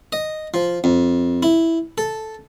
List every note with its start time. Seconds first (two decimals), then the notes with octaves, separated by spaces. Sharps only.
0.13 D#5
0.54 F3
0.84 F2
1.43 E4
1.98 A4